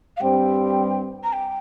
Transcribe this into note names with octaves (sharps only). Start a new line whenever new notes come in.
F5
G2 G3 C4 G5
A#5
G5